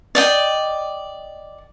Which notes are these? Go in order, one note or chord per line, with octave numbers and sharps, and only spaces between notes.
D5 D#5 G5